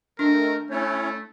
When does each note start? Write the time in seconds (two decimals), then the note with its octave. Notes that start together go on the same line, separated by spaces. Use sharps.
0.19 D#3 A3 D4 A#4
0.70 A3 C#4 E4 C#5